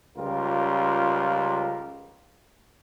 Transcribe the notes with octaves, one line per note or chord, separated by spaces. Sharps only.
C#2 G3 F4 A#4